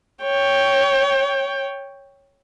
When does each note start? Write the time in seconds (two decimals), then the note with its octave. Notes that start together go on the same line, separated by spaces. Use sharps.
0.23 C#5 G5